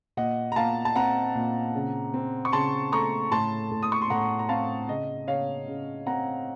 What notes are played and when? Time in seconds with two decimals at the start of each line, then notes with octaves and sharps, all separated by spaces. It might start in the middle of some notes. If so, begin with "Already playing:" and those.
0.17 A#2 D#5 F#5
0.52 A#5
0.56 A#2 F5 A5
0.85 A5
0.96 C4 F#5 A#5
1.35 A#2
1.75 C#3
2.14 C4
2.45 C#6
2.52 C#3 A5 C6
2.92 A3 A#5 C#6
3.31 A2 A5 C6
3.71 A2
3.83 D#6
3.92 C#6
4.02 C6
4.10 A2 F#5 A#5
4.39 A#5
4.49 C4 F5 A5
4.88 C#3 D#5
5.28 C#3 C#5 F5
5.68 C#3
6.06 C4 F#5 A#5